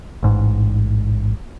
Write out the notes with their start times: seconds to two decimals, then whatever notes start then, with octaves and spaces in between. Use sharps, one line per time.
0.23 A1 G#2